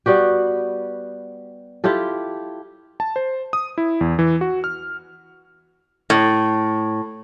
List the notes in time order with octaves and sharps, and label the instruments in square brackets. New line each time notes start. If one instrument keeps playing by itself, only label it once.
[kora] G3 B3 F#4 G4
E4 F4 G4 A4
[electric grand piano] A5
C5
D#6
E4
E2
E3
F#4
F6
[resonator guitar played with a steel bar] A2